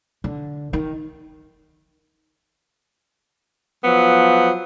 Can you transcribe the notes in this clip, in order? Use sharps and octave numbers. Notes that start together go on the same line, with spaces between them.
D3
D#3
F3 F#3 B3